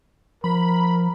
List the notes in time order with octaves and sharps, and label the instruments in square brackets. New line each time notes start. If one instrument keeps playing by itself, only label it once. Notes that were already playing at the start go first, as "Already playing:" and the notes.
[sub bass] F3 [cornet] A#4 [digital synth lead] B5